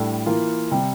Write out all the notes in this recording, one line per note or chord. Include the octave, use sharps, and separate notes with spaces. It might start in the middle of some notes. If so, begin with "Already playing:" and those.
Already playing: A2 G3 D4 A4
E3 A#3 F4
C3 G3